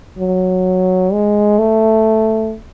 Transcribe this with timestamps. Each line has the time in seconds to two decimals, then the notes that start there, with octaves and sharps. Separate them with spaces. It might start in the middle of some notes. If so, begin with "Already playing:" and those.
0.19 F#3
1.13 G#3
1.59 A3